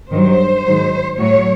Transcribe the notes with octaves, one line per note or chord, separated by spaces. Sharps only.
G2 D#3 F#3 C5
G#2 D#3 F#3
A2 F#3 C#5